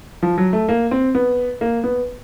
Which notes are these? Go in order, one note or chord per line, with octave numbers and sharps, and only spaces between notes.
F3
F#3
A3
A#3
C4
B3
A#3
B3